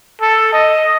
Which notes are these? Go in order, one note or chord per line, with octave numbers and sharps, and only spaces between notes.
A4
D#5